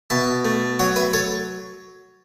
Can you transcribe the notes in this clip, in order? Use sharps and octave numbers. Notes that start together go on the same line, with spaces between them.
B2 E5 A5
A3
F#3 C#5 F#5
B4 E5
A4 C#5